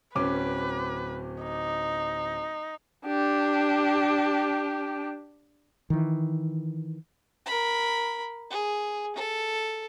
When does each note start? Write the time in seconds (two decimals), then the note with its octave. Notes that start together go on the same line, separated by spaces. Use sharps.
0.15 D1 C#4 B4 D6
1.42 D#4
3.06 D4 G4
5.90 D#3 E3
7.46 A#4 B5
8.51 G#4
9.16 A4